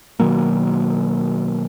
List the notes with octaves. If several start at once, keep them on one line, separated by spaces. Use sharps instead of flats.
B2 D#3 F#3 A#3